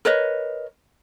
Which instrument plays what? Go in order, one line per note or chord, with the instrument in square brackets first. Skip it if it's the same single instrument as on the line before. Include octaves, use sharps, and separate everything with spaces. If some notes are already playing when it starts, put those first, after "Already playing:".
[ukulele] A#4 B4 C#5 D#5